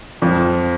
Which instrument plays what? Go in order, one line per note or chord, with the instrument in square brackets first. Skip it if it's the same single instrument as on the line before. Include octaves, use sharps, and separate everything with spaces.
[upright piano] F2 F3